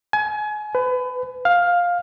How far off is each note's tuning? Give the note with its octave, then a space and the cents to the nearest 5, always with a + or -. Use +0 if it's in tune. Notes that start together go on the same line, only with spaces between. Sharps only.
G#5 +30
B4 +30
F5 +10